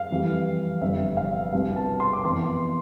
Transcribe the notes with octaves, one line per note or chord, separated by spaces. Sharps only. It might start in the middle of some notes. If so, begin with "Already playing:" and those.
Already playing: F5
F2 E3 G3
G1 F2 C3 E5
F5
C2 B2 B3 F5
A5
C6
D6
F2 E3 B3 C6